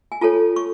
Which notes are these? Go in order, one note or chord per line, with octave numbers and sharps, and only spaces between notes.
G#5
F4 A4 C#5 A5
C#6